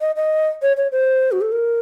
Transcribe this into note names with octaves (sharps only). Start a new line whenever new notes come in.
D#5
D#5
C#5
C#5
C5
F#4
A4
A#4